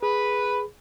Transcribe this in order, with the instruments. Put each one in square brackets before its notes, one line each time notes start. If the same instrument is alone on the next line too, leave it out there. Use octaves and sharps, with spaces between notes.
[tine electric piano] G#4 [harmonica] B4 B5